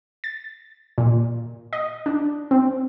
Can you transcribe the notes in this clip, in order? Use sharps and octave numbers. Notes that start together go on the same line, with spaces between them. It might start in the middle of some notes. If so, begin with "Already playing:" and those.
A6
A#2
D#5
D4
C4